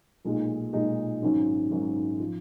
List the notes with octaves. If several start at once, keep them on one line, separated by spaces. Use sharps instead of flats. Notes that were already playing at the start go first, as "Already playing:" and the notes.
B1 A#2 G#3 D#4
B1 A#2 G#3 D#4
G#1 G#2 F#3 C#4
G#1 G#2 F#3 C#4
F3